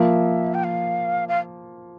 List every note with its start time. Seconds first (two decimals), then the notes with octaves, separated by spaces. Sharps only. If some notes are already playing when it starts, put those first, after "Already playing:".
Already playing: F3 A#3 F4 E5
0.54 G5
0.64 F5
1.29 F5